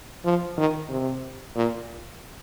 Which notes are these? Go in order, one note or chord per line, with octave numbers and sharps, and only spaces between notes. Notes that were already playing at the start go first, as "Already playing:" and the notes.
F3
D#3
C3
A#2